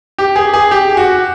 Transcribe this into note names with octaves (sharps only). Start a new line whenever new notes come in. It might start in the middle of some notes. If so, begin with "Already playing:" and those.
G4
G#4
G#4
G4
F#4